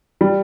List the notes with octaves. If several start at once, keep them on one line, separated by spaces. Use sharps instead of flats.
G3